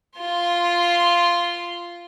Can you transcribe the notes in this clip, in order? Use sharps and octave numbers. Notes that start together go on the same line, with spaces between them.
F4 C6